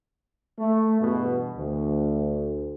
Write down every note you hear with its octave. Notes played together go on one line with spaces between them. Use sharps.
A3
E2 G2 B2
D2